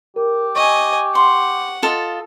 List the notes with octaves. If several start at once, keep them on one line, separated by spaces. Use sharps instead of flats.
G4 A#4
D#5 G#5 C#6
F#5 C6
F4 A4 D#5